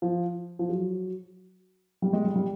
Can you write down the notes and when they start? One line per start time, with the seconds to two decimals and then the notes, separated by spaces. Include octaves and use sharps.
0.02 F3
0.59 F3
0.69 F#3
2.02 G3
2.13 G#3
2.24 G3
2.36 G3